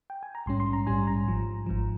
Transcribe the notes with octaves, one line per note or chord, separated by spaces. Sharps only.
G5
G#5
A#5
A#1 G#2 G3 C#4 C6
C6
A#5
A#1 G#2 G3 C#4 G#5
A#5
G#1 G#2 F3
G#1 G#2 F3